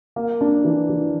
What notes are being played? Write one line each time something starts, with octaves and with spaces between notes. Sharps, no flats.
A#3
D4
E3
E3